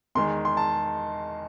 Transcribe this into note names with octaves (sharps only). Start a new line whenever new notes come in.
E2 D#3 G#3 C6
C6
A5